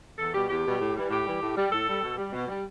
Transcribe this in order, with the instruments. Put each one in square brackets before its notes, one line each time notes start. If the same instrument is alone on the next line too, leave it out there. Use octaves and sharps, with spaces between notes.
[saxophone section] E2 A4
B2 G3 G4
E2 G4
B2 G3
A2
E3 G3
A2 G4
E3 G3
A2
G3
A2 A4
G3
B2
G3
B2
G3